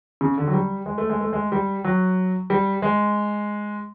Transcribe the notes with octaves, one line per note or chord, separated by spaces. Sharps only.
C#3
D3
F#3
G3
G#3
A3
G#3
A3
G#3
G3
F#3
G3
G#3